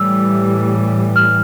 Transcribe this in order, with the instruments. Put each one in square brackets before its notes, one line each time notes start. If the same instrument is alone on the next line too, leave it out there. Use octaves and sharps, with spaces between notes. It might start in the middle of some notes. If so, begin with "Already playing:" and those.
Already playing: [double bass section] A2 E3 G3 [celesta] E6
[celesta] F6